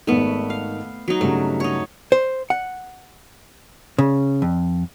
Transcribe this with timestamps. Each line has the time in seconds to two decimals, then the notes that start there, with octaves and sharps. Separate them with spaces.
0.07 G#1 D#3 A3 B3
0.50 F5
1.08 F#3 D#4
1.21 G2 C#3 G3 A3
1.60 D#4 C#5
2.12 C5
2.50 F#5
3.98 C#3
4.42 F2